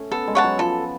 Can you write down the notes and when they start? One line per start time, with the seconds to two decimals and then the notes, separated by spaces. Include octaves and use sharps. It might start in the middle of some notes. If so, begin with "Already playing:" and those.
Already playing: A3 C#4
0.12 B3 A4
0.27 G#3
0.35 C#5 F#5 A5
0.44 F#3
0.59 F3 A4